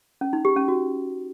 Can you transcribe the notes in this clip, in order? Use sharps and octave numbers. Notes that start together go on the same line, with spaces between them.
C#4
D#4
G4
C#4
F#4